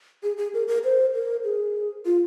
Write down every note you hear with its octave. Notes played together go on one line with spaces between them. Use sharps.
G#4
G#4
A#4
A#4
C5
A#4
G#4
F4